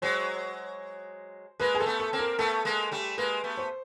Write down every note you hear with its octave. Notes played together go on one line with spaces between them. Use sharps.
F#3 G#3 C5
G#3 A#3 B4
G#4
A#3 A4
A3 B3
A4
A#3 C4
A#4
A3 B3 A4
G#3 A#3
G3 A3
G#3 A#3 B4
A3 B3
C5